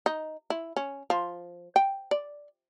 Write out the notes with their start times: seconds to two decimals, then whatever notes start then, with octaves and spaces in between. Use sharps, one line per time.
0.06 D#4
0.50 E4
0.77 C#4
1.10 F3
1.76 G5
2.11 D5